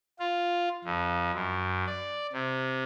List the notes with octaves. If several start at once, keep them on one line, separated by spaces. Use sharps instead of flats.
F4
F2
F#2
D5
C3